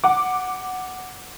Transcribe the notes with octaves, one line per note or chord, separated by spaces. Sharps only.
F#5 D6